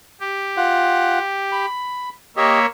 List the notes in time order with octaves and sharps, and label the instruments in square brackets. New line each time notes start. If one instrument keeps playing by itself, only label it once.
[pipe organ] G4
[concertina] F4 F#5
B5
[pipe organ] A#3 C#5 E5 [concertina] G4 D#5